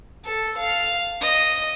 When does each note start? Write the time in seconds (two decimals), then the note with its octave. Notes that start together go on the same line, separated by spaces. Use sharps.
0.25 A4
0.57 F5
1.21 D#5